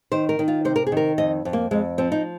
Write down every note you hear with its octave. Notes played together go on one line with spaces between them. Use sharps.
D#3 C5
A#4
D#3
F4
C3 C5
A#4
G#4
D#3 A#4
F2 D#5
F2
A#3
F2 G#3
F3 C4
D#4